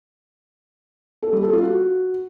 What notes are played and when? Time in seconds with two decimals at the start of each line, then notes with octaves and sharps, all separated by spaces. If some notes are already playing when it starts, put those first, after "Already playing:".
1.22 A4
1.33 G3
1.43 A4
1.53 F4
1.63 F#4